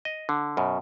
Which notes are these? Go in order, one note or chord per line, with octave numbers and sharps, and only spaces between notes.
D#5
D3
F#2 B2